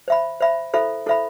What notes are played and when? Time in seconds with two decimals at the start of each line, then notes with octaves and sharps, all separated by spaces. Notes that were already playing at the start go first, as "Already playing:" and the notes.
0.08 C5 E5 B5
0.41 C5 E5 B5
0.74 E4 A4 C5 E5 B5
1.06 E4 A4 C5 E5 B5